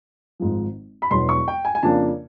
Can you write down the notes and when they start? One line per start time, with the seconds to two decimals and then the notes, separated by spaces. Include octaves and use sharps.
0.40 G#1 G#2 F3
1.02 B5
1.11 E1 E2 B2 F#3 C6
1.29 C#6
1.48 G5
1.65 G#5
1.75 G#5
1.83 F2 C#3 F3 A#3 D4 A5